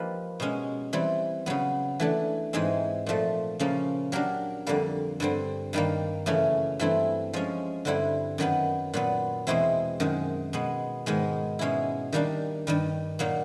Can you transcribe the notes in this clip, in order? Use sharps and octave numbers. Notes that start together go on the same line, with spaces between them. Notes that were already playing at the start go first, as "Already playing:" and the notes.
Already playing: F3 A#3 D#4 G4 B4
B2 G#3 C#4
E3 G3 C4
C#3 F#3 B3
E3 A3 D4
G#2 E3 G#3 C4 D#4
A#2 F3 A3
C#3 F3 A#3 C#4
F#3 A#3 D4 G4 A#4
F2 D3 G3 A#3
G2 D3 G3 C4
G2 D#3 G3 A#3
F#2 C#3 E3 A3 C#4
G2 E3 A3 C4 E4
F3 G#3 C#4
G2 D3 G3 C4 E4
F#2 D#3 F#3 B3
A#2 F#3 B3
E2 B2 G#3 C4 E4
F#2 D#3 G#3
B2 G#3 B3
G#2 D#3 G#3 B3
B2 G#3 C#4 E4
D#3 G3 A#3 D4
G2 D#3 G3
A#2 F#3 A#3 D#4